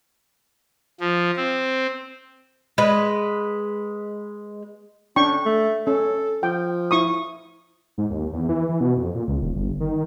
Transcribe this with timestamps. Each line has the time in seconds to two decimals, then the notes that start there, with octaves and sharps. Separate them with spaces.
1.00 F3
1.37 C4
2.78 G#3 B4
5.16 C#4 D4 G5 C#6
5.46 A3
5.87 C#4 A4
6.43 F3 G5
6.91 E4 C#6 D#6
7.98 G#2
8.10 D#2
8.33 E2
8.49 E3
8.69 E3
8.81 B2
8.97 F2
9.15 A#2
9.28 C#2
9.42 D#1
9.55 G1
9.80 D#3